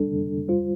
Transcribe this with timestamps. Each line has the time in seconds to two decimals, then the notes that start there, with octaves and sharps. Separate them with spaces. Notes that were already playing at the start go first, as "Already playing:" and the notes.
Already playing: G3 D4 A4
0.48 G3 F4 C5